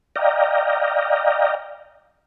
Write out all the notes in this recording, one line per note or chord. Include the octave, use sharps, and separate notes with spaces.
D5 D#5 F5 G5 A#5